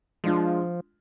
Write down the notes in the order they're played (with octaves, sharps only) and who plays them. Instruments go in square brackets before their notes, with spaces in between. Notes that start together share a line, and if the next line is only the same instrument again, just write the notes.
[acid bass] F3 [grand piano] G#3 D4 F4